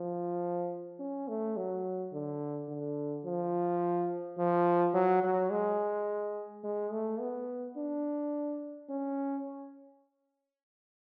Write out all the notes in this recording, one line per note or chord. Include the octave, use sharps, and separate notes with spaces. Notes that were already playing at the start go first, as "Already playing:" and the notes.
Already playing: F3
C#4
A3
F#3
D3
D3
F3
F3
F#3
F#3
G#3
G#3
A3
B3
D4
C#4